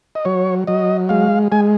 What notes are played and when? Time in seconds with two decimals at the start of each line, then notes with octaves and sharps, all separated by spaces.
0.15 D#5
0.25 F#3 C#5
0.67 F#3 D#5
1.09 G#3 F5
1.52 G#3 G#5